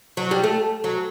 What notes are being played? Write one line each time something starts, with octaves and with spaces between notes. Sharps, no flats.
F#3
G3
A3
F#3